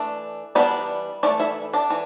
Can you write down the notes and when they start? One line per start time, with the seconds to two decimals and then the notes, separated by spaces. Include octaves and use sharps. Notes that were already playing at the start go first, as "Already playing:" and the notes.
Already playing: E3 A3 D4
0.55 E3 G3 B3 D4 B4
1.23 E3 A3 D4 D5
1.39 E4 E5
1.73 D4 D5
1.90 E3